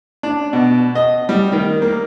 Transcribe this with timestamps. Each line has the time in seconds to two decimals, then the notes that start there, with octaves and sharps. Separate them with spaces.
0.23 D4
0.53 B2
0.95 D#5
1.29 G3
1.52 D#3
1.82 A#3